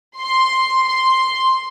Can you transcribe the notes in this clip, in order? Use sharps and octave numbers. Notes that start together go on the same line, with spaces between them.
C6
C6